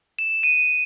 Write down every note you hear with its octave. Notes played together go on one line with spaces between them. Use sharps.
E7
D#7